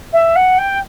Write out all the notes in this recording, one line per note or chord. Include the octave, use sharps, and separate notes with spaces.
E5
F#5
G5